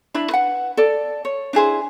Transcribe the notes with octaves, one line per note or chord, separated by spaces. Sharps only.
D4 E4 B5
B4 F#5
A4 D5
C#5
D4 E4 G#4 C5